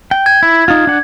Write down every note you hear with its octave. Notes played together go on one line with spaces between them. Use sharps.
G5
G#6
E4
D#4 F4
D4 F#5